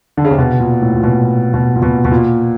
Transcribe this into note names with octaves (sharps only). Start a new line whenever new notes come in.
D3
C#3
C3
B2
A#2
A2
A#2
B2
B2
A#2
B2
B2
A#2